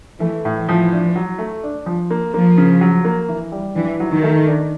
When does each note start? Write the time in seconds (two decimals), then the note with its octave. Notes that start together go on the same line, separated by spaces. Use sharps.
0.20 E3 A3
0.45 A2
0.56 E3
0.69 F3
0.92 D4
1.16 F#3
1.38 A3
1.63 D4
1.86 F3
2.11 A#3
2.34 F3 A#3
2.57 C#3
2.81 F#3
3.05 A#3
3.28 E3
3.52 G3
3.76 E3 D4
4.00 F#3
4.11 D#3
4.23 A3
4.47 D4